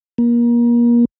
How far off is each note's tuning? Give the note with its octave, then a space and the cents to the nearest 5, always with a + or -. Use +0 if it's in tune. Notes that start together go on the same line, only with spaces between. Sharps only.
A#3 +30